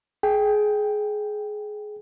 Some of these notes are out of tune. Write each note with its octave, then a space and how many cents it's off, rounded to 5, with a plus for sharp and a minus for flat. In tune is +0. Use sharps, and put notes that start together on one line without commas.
G#4 +20 G5 +0